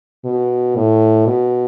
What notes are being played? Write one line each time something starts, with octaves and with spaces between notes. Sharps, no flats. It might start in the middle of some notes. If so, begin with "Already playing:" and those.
B2
A2
B2